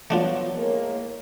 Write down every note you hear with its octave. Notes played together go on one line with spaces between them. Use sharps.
F3 F#3 A3 B3 D4 F4 C#5
A2 G#3 A#3